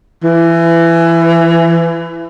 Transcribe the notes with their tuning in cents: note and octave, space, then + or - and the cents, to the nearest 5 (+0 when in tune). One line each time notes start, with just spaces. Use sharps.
E3 +20